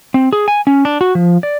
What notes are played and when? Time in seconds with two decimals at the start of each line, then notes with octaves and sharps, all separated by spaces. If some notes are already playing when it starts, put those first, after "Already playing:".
0.14 C4
0.33 G#4
0.48 G#5
0.67 C#4
0.85 D4
1.01 F#4
1.15 F3
1.43 D5